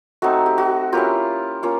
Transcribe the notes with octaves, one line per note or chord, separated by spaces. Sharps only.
A3 C4 D#4 F#4
G4
F#4
A#3 C#4 E4 F4 G4
A#3 C#4 F4